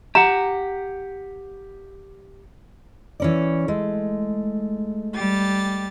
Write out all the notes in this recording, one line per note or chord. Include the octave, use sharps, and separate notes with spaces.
G4 F#5 A#5
E3 C#4 D5
G#3 A3
G3 G4 A6